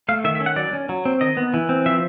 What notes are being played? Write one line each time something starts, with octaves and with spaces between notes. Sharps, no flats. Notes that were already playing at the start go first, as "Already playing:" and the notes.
A3 F5
D#3 E5
E5
C#4
F#5
F#3 D5
C#4
F#3
C4
D#3 D#5
B3
E3
C4
F3 E5